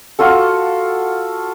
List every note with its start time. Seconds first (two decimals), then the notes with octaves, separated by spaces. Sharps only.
0.19 F4 F#4 A4